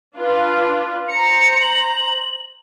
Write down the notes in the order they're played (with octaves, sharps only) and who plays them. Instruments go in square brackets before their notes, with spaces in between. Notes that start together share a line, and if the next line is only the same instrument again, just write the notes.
[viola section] D4 F4 B4
[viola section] C5 A#5 [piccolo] C#7
[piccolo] F#7